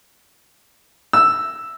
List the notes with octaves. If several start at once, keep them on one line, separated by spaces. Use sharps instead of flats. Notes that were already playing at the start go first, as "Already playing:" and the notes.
E6